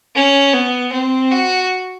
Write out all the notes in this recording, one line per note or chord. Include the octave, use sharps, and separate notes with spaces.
C#4
B3
C4
F#4